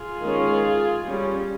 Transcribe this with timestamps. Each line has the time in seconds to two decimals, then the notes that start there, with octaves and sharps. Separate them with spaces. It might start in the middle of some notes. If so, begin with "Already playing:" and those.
Already playing: F4 G#4
0.22 D#3 G#3 C#4
1.05 G3 C#4